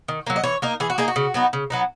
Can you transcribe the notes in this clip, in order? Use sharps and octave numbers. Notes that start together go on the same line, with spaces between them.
D#3
F#3 A#3
D#5
E3 C#5
A#3 D#4 A#4
E3 G#4
F#4
A#3 D#4 G#4
F#4
C#3
F#3 B3 D#4
C#3
F#3 B3 D#4